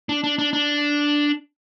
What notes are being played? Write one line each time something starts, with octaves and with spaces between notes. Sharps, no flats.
D4
D4
D4
D4